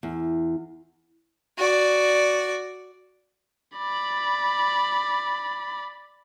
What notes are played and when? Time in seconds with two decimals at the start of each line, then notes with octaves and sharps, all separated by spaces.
0.03 E2
1.58 F#4 D5
3.78 D5 B5